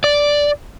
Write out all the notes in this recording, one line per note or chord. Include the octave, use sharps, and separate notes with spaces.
D5